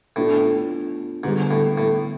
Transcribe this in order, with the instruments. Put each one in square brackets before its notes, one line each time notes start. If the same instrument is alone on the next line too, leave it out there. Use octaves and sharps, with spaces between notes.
[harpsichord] A2 [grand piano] B3 D4 F4
[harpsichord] G#2 [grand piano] D3 G3 B3
[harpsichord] A2
A2